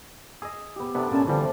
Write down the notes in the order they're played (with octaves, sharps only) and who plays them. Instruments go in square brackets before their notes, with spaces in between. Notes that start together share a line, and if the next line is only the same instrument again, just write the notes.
[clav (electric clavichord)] G#4 D#5 [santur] E6
[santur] B3 G4
[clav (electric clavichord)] C3 B3 [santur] D4 A4 D5
[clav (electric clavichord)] A#2 A5 [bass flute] C#4 [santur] D5 G#5
[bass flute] D3 [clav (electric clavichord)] E3 G3 [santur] F3 A3 F4